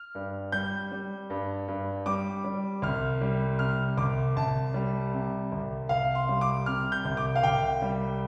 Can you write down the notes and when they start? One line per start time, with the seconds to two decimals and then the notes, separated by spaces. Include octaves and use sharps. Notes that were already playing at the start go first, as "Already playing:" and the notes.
Already playing: F6
0.15 G2
0.52 G3 G6
0.92 G3
1.30 G2
1.68 G2
2.06 G3 D6
2.44 G3
2.82 C2 F6
3.21 G3
3.59 C3 F6
3.97 C2 D6
4.36 C2 A5
4.74 G3
5.14 C3
5.52 C2
5.89 C2 F5
6.15 C6
6.29 G3
6.41 D6
6.66 C3 F6
6.92 G6
7.05 C2
7.17 D6
7.36 F5
7.43 C2 G5
7.82 G3